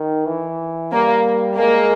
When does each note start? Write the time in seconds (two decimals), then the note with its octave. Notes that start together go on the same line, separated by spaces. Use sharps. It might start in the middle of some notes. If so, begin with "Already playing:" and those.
Already playing: D#3
0.27 E3
0.92 G3 A#3
1.58 G#3 A#3